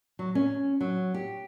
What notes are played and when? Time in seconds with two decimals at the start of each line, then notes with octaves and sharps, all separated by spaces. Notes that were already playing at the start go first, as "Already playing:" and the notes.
0.19 F#3
0.35 C#4
0.81 F#3
1.14 G4